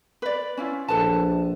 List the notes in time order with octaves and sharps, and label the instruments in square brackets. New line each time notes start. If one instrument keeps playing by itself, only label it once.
[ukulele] B4 D5
C#4 E4 F4
[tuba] A#1 [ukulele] A4 B4 A5